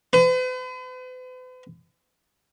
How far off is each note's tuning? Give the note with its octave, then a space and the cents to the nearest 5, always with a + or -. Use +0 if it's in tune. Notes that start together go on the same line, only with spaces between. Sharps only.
B4 +45